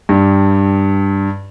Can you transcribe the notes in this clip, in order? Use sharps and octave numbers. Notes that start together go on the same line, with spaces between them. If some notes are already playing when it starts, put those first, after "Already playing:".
G2